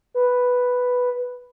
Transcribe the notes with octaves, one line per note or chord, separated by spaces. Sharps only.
B4